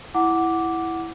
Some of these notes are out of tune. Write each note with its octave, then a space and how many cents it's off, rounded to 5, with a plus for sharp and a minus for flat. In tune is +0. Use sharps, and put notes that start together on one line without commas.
E4 +0 F#5 +0 D6 -5